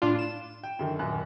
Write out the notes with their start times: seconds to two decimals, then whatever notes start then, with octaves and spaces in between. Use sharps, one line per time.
0.02 A2 D4 F4
0.19 E7
0.63 G5
0.79 F#2 D3 D#3
0.99 D#1 F#2 F#6